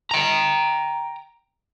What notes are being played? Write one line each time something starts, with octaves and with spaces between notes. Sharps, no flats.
G5 A#5